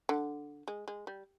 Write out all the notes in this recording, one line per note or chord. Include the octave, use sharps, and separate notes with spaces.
D3
G#3
G#3
G3